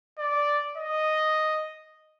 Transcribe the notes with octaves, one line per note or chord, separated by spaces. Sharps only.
D5
D#5